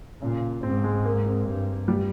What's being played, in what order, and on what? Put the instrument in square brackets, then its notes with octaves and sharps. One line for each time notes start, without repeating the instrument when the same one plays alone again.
[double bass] A#2 [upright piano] C#3
[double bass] G#2 [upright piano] C4
[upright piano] G#3
A#3
C4
[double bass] G2
[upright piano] G3